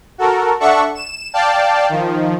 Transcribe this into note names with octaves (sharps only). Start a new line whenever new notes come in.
F#4 A4 A#4
D4 A4 E5 F#5 C#6
E7
D5 F5 G5 A5
D#3 F3